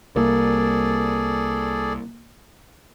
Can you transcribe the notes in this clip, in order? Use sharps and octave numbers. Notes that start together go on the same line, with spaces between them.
C2 A#3 G#4 A4 D5